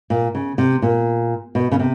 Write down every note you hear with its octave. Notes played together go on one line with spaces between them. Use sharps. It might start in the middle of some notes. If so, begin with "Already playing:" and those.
A#2
C#3
C3
A#2
B2
C#3
C3